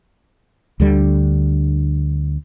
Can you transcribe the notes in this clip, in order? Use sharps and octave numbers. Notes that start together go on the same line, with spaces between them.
D2 D3 G3